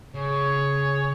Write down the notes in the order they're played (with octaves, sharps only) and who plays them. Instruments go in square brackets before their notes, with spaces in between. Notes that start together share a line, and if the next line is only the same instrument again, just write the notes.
[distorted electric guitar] C#3 [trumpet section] G#4 C#5